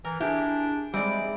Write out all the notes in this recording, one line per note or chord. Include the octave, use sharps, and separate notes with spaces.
E3 A#4
D4 E4 G4 G#4
E3 G3 G#3 C4 D#4 E4 D5 D6